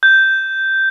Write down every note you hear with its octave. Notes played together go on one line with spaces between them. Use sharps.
G6